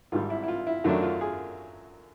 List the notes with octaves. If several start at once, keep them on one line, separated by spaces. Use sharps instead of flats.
G#1 G#2 D#3 G3 F4
E4
E4
F4
E4
F#2 D#3 F#3 A3 D4 F4
F4
G#4